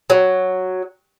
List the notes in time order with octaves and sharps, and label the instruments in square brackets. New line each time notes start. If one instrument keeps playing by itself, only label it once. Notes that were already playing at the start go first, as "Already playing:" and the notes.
[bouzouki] F#3